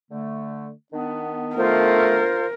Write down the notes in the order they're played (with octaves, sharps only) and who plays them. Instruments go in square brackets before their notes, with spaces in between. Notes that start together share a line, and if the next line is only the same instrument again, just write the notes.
[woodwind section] D3 A3
D#3 B3 D4
[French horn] A3 [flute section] F4 C5 F5 [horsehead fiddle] A#4